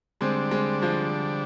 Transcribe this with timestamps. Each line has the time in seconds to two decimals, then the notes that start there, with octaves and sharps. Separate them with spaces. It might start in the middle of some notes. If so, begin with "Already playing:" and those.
0.21 D3 G3 G#3 C4 D4
0.51 G#3 C4
0.82 F3 G#3